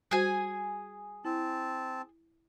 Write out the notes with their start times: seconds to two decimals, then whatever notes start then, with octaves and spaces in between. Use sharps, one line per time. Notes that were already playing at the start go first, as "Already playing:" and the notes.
0.11 G3 F#4 G#4 C5 G#5
1.25 C4 E4 A5